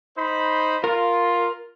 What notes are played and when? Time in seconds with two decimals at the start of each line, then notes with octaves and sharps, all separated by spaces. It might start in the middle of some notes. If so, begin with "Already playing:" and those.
0.18 D#4 C5 B5
0.84 F4 A#4